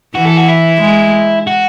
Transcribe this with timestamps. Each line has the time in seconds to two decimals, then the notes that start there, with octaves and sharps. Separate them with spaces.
0.15 E3 F#4
0.26 A4
0.37 F#4
0.48 E4
0.81 G#3
1.47 F#4